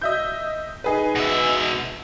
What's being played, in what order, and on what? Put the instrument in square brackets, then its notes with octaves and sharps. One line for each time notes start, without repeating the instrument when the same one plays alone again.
[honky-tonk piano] D#5 E5 G6
D#4 G#4 B4
[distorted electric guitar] B2 E5